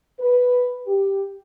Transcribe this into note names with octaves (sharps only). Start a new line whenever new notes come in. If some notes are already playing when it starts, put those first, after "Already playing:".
B4
G4